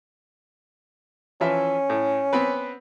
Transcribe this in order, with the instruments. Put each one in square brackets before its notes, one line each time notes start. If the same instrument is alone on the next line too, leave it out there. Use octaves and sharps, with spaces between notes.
[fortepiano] E3 F3 E5 [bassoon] C#4
[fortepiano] A2
B3 C4 B4